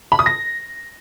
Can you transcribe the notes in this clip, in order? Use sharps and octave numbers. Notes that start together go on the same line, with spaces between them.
B5
D#6
A#6